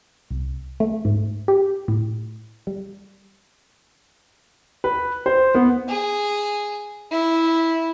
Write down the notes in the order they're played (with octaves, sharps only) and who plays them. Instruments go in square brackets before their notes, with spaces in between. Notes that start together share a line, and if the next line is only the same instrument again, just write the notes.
[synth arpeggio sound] C2
A3
G#2
G4
A2
G3
[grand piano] B4
C5
B3
[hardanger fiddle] G#4
E4